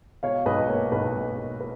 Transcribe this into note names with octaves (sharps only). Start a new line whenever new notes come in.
B2 C#5 F5
B1 B4 D#5
A#3 C#5
B1 B4
B1
A#3
B4